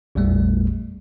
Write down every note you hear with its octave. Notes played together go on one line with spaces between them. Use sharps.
A1 E2 A#2 G3 A3